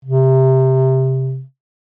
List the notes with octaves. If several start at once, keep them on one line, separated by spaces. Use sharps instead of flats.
C3